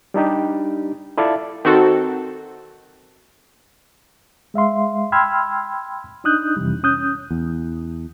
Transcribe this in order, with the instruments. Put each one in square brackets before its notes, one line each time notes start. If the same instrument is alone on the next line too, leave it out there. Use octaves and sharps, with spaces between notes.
[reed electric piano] G3 D4 D#4 G4
E4 F4 A4 D5 E5 F5
[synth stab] D#3 C4 F#4 A4
[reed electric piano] G#3 E5 F5 C6
G5 B5 C6 E6 F6 G#6
D4 D#4 D#6 F#6 G6
F2 C3 E3 G3
C#4 D#6 F#6 G6
[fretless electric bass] E2